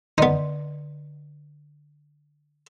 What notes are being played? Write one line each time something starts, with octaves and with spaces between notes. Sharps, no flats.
D3 B3 D#4 D5 C6